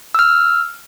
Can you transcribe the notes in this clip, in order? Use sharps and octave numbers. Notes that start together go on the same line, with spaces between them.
E6 F6